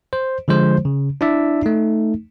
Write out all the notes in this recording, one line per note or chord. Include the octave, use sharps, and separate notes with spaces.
C5
D3 F3 G#3 C5
C#3
D4 E4 D5 E5
A3 D#4